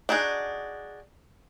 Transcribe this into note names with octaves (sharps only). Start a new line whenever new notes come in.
D4 D#4 F#4 G#4